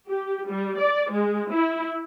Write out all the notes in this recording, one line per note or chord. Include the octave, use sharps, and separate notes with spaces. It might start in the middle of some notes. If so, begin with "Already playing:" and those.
G4
G3
D5
G#3
E4